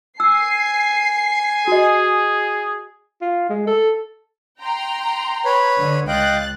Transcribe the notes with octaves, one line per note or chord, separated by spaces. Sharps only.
G#5 E6 C7
F#4 G#4 D#5
F4
G#3
A4
G5 A#5 C6
B4 C#5 B5
D3
C#2 D#5 F5 G5 F#6 A6